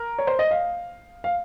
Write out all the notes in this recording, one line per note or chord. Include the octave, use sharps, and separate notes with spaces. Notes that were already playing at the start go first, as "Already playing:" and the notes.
Already playing: A#4
C#5
C5
D#5
F5
F5